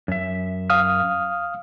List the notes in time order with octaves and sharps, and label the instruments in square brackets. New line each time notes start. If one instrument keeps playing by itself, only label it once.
[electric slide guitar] F#2 E5
[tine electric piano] F5 D#6 F6